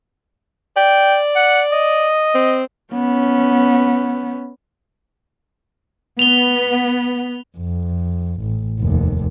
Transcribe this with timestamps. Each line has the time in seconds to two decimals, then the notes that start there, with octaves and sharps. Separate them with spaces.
0.77 D5 G5
1.36 F#5
1.72 D#5
2.34 C4
2.93 B3 C#4
6.19 B3 F7 G7
7.58 F2
8.41 A1
8.79 F1 D#2